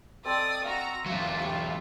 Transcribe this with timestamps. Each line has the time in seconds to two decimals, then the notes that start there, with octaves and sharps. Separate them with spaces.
0.25 C4 A4 D5 D#5 D#6
0.64 F#4 F5 A#5
1.06 E2 F#3 F4 C#5 E5
1.40 G4 C#5